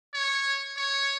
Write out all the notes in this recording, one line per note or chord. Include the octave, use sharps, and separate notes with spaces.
C#5
C#5